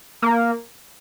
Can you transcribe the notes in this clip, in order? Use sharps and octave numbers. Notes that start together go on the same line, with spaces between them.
A#3